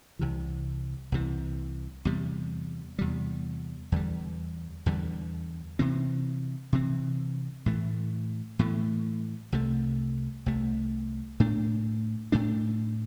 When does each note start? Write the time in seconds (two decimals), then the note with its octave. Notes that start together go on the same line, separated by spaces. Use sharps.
0.19 C2 C3 E3
1.12 C2 C3 E3
2.05 E2 C3 G3
2.99 E2 C3 G3
3.92 E2 D3 G3
4.86 E2 D3 G3
5.79 C3 E3 C4
6.73 C3 E3 C4
7.66 A2 E3 A3
8.59 A2 E3 A3
9.52 C2 C3 A3
10.46 C2 C3 A3
11.40 A2 A3 D4
12.32 A2 A3 D4